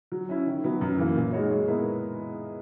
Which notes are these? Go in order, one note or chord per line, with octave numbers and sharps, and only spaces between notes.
F#3
C#4 E4
D#3
F#3 B3
F#2
E3 A#3
A#2
G#3 D#4 F#4 C#5
G#3
B3 E4 A#4